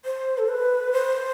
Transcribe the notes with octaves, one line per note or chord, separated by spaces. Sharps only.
C5
A4
B4
C5